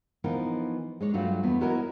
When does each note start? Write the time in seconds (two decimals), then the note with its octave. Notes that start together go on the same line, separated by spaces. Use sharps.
0.24 E3 F3 B3 D#4 F4 A#4
1.00 G#3 D4 C#5
1.14 G2 F#3 A3 F4 F#4
1.43 E2 B3
1.61 E4 F#4 A#4 C#5 D#5